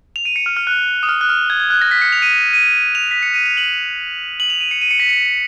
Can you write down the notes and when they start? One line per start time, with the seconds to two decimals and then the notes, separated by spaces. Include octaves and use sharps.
0.16 F7
0.25 D#7
0.36 C#7
0.46 F6
0.57 F6
0.67 F#6
1.03 D#6
1.09 F6
1.21 F#6
1.29 F6
1.50 G#6
1.60 G#6
1.70 F#6
1.81 A#6
1.91 B6
2.01 C#7
2.12 F7
2.22 D#7
2.33 D#7
2.53 D#7
2.95 F7
3.11 B6
3.23 C#7
3.34 D#7
3.46 F7
3.57 F#7
4.40 F#7
4.50 F7
4.60 D#7
4.71 C#7
4.81 D#7
4.91 C#7
5.00 B6
5.09 C#7